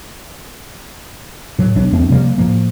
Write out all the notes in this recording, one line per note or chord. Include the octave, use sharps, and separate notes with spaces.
A2 F#3
B1 F#3 D4
E2 A3 C4 D4
C3 F3 G3 A#3
A2 F3 A#3